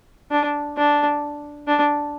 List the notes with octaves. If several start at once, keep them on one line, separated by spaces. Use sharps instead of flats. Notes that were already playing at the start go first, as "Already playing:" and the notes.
D4
D4
D4